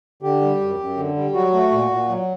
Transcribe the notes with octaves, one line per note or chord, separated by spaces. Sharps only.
D3 G4
G3
F#2
F#2
D3
G3
F#3 F#4
A3
A#2
A#2
F#3